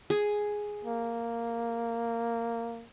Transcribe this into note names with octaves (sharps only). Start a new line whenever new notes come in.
G#4
A#3